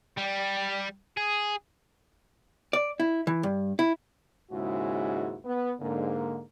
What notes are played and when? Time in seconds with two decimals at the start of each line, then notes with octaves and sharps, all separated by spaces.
0.18 G3
1.17 G#4
2.73 D5
3.00 E4
3.27 E3
3.43 G2
3.79 E4
4.51 D#2 G#2 C#3 G#3 E4 F#4
5.44 B3
5.80 G#2 D3 A#3